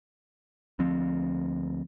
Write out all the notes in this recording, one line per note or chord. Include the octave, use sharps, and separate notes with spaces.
D2 F3 C4